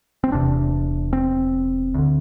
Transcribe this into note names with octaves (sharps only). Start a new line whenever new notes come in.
C4
E1 E2 C3 D4
C4
D2 D3